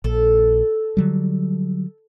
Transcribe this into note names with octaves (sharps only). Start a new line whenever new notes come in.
A#1 A4
D3 F#3 G3